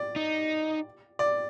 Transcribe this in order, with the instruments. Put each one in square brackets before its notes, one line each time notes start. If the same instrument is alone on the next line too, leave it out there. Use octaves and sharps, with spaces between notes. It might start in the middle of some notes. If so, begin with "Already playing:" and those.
Already playing: [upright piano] D5
[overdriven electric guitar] D#4
[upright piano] D5